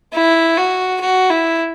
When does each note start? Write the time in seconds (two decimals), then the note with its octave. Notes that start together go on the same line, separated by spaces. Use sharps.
0.13 E4
0.57 F#4
1.01 F#4
1.30 E4